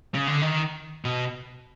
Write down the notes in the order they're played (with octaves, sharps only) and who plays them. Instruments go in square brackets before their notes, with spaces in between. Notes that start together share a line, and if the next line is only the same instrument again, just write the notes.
[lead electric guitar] C#3
D3
D#3
B2